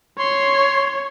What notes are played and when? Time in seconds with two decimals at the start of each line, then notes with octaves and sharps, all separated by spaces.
0.19 C#5 C6